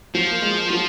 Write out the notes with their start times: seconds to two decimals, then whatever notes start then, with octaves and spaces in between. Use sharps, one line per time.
0.15 F3 F#3
0.31 A#3
0.42 G#3
0.70 F#3